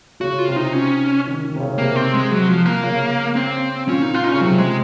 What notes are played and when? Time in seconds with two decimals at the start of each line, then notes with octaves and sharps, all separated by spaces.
0.21 C#3 F#4
0.39 F4
0.47 C3
0.56 D#4
0.73 C#4
1.26 D#3
1.44 D#3
1.55 C3
1.60 C#3
1.78 C3 A#3
1.96 C4
2.14 G#3
2.31 F#3
2.49 F3
2.66 A#3
2.83 C#3
3.36 C4
3.88 A#2 C#4
4.02 D#4
4.14 F4
4.24 D#4
4.28 C#3 C#4
4.41 C3 F#3
4.58 G#3